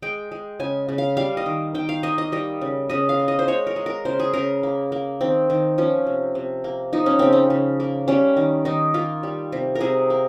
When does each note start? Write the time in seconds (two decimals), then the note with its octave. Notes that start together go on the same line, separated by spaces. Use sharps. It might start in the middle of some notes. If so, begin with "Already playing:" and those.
0.02 G#3 G5
0.32 G#3
0.60 C#3 G#5
0.89 C#3
0.98 F5
1.17 G3 F5
1.37 D#5
1.46 D#3
1.75 D#3 G5
1.89 F5
2.03 A#3 D#5
2.18 D#5
2.32 G3 D#5
2.61 C#3
2.90 C#3 D#5
3.09 F5
3.19 A#3
3.28 D#5
3.39 C5
3.48 G#3 C#5
3.67 A#4
3.76 G#3
3.86 A#4
4.05 C#3 C5
4.20 G#4
4.33 C#3 A#4
4.63 A#3
4.92 A#3
5.21 D#3 C4
5.50 D#3
5.78 F3 C#4
6.06 C3
6.35 C3
6.64 A#3
6.93 F3 D#4
7.06 C#4
7.19 C#3 C4
7.33 C#4
7.50 C#3
7.80 A#3
8.08 G3 C#4
8.37 D#3
8.65 D#3 D#4
8.94 A#3 F4
9.23 G3
9.52 C3
9.75 A#4
9.80 C3 G#4
10.10 A#3